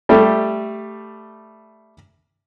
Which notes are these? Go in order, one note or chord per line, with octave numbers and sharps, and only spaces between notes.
G3 A3 G4